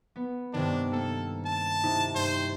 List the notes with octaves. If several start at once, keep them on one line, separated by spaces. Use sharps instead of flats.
B3
G2 C3 D#3 D4
A#3 A4
A5
C3 D#4 E4
G2 C5